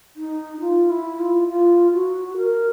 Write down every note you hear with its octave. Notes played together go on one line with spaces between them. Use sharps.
D#4
F4
E4
F4
F4
F#4
A#4